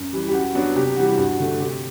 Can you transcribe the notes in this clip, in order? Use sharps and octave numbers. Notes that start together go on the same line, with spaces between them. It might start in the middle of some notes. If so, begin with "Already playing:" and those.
Already playing: F#2
E3 G3
G4
F#2 F#4
F#3 B3 D4
C3 G4
E3 G3 F#4
G2 F#4
D3 A3
C3 G4